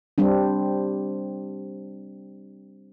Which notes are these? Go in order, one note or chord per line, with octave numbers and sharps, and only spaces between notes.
G3 C4 D4